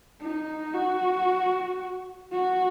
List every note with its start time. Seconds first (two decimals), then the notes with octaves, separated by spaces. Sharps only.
0.21 D#4
0.75 F#4
2.32 F#4